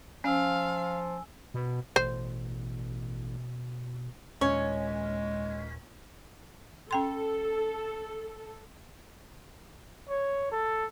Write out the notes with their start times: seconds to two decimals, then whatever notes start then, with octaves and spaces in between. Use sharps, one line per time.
0.24 F3 C#4 F5 G#5 E6
1.54 B2
1.96 A1 B2 C5
4.41 D#2 A#2 D#3 G#3 C#4 C#5
6.91 C#4 A4 G5 C6
10.09 C#5
10.51 A4